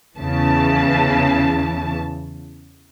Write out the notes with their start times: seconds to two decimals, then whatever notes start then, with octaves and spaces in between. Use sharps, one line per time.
0.19 E2 C#3 E3 A5